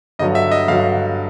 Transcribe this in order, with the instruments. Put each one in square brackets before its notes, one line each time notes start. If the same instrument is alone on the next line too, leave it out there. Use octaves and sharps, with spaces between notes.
[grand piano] G2 D3 F#3 [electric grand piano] D#5
[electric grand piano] E5
D#5
[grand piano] G2 D3 F#3 [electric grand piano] F5